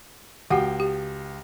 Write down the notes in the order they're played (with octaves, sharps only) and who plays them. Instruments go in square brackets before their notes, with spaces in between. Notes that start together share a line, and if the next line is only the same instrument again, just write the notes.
[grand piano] C#2 G5 C7 [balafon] F#4 G4 F#5
[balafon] G4